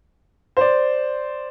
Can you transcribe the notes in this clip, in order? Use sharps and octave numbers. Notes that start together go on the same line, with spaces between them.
C5 D5